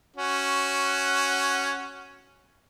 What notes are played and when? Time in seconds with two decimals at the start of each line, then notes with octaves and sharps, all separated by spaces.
0.16 C#4 F#4